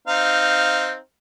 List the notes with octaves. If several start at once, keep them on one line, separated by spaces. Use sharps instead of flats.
C4 D#4 F5